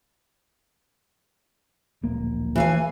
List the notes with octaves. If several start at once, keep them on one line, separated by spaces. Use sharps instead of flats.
D1 A#1 A#3
E3 F5 G#5